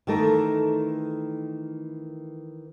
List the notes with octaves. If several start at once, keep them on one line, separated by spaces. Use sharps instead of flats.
D#3 E3 A3 A4 A#4